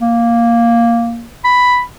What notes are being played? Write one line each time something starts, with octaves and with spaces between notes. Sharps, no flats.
A#3
B5